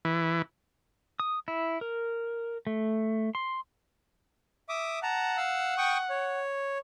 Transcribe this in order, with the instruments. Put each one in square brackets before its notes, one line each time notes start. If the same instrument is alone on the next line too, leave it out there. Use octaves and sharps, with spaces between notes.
[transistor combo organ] E3
[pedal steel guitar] D#6
E4
A#4
A3
C6
[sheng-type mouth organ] E5 D6 D#6
[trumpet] F#5 [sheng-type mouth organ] A5 A#5
[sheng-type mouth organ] F5 E6
G5 C#6 D#6
C#5